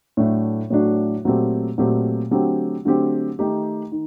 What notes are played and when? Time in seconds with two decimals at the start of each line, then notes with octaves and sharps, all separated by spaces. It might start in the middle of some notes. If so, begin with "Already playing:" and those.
0.17 A2 F#3 A3 D4 F#4
0.70 A2 F#3 A3 D4 F#4
1.25 A#2 F#3 A3 C4 G4
1.78 A#2 F#3 A3 C4 G4
2.31 D3 F#3 A3 C4 G4
2.85 D3 F#3 A3 C4 G4
3.39 D#3 A3 D#4 G4
3.92 D#3